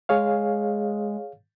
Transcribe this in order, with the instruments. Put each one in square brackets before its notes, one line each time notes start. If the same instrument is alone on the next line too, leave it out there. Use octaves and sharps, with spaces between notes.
[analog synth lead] G#3 [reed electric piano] G#4 C#5 F5